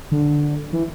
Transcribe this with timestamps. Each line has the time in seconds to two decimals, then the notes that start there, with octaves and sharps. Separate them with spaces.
0.11 D3
0.72 E3